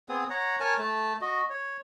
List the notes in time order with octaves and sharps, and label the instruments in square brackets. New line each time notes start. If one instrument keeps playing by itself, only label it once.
[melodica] B3 C4 G#4 D#6
C#5 F#5 A#5
A#4 C#5 G#5 A5
A3 A5
F#4 D#5
C#5